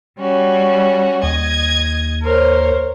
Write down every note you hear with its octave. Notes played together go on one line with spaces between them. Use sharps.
G3 C#4 F#4
D#2 D#5 G#6
A#4 C5 C#5